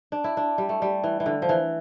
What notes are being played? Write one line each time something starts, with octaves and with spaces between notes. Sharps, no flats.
D4
E4
D4
G3
A3
G3
E3
E3
D3
F3
E3